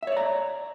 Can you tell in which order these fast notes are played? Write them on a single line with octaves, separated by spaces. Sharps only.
E5 C#5 D5 A#5